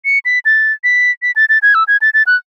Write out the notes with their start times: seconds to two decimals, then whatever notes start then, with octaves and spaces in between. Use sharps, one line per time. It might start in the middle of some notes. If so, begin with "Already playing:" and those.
0.05 C#7
0.25 B6
0.45 A6
0.84 B6
1.22 B6
1.36 A6
1.49 A6
1.62 G#6
1.75 E6
1.88 G#6
2.02 A6
2.14 A6
2.27 F#6